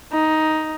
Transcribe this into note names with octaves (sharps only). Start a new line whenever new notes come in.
D#4